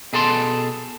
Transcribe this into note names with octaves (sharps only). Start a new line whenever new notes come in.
B2 G#4 A4 A5 C6